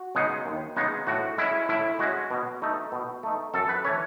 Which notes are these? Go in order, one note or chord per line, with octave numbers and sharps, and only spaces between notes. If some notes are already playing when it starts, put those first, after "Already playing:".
Already playing: F#4
C#3 G#3 B3 D#4
D#2
C#3 G#3 B3 D#4
A2 F#4
G#3 C#4 E4
A2 E4
G#3 C#4 F#4
B2
A3 D#4
B2
A3 D#4
F#2 A4
B4
E3 A3 C#4 C#5